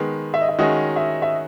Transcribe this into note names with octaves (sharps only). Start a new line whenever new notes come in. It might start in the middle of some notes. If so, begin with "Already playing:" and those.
Already playing: D#3 G#3 B3
E5
D#5
E5
D#3 G#3 C#4 F#4 D#5
E5
E5